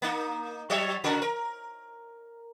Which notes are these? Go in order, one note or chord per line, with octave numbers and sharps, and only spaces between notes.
A#3 D#4
F#3 C#5 E5
C#3 F#4 A#4
A#4